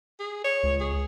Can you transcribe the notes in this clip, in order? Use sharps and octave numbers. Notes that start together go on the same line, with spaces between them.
G#4
C#5
C#2
G#4